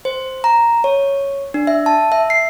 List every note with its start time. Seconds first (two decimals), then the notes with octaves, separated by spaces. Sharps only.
0.05 C5
0.44 A#5
0.84 C#5
1.54 D4
1.67 E5
1.86 A5
2.12 E5
2.30 C7